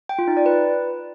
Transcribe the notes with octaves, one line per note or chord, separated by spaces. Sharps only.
G5
F4
D#4
D5
B4